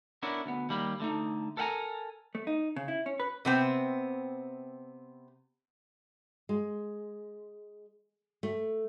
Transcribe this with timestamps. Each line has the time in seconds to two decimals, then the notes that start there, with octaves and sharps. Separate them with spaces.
0.23 B3 C#4 D4 E4 A#4
0.46 D2 B3
0.69 D#2 G3 A#3 B5
1.00 D3 A3 D#4
1.57 A4 A#4 E5 F#5 G#5 A#5
2.35 A3
2.47 D#4
2.76 C#3
2.88 E4
3.06 C#4
3.20 B4
3.45 C3 B3 C4
6.49 G#3
8.43 A3